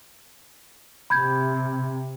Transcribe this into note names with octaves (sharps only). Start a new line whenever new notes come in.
C3 B5 G6 G#6